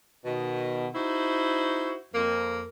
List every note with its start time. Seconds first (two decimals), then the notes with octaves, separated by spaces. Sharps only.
0.25 B2 D#3
0.94 D#4 E4 F#4 C5
2.14 F2 A#3